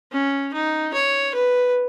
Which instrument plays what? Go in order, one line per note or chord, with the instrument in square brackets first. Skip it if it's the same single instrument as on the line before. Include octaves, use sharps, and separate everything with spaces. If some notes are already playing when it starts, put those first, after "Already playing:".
[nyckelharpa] C#4
D#4
C#5
B4